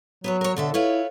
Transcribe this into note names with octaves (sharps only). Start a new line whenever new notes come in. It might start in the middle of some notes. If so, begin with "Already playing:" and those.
F#3 B3 B4 C#5
A#4 C#5
B2 D3 A4 E5
E4 F4 B4 C#5